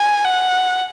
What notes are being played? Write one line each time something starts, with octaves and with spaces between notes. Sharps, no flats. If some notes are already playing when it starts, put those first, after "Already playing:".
Already playing: G#5
F#5